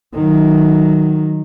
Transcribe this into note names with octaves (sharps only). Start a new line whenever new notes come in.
D#3 F#3